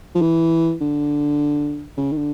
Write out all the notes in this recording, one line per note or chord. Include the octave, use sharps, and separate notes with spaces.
F3
E3
D3
C#3
D#3
D3